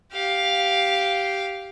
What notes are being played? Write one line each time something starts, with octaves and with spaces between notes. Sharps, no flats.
G4 F5